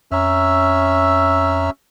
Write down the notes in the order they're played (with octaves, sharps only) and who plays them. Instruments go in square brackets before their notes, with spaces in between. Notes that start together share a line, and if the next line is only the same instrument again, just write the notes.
[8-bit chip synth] F2 A#5 E6 [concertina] C#4 E5